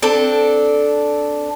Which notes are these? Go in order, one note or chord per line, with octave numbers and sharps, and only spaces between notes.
C4 D4 A4